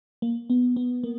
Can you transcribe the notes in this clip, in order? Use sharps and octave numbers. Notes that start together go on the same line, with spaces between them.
A#3
B3
B3
A#3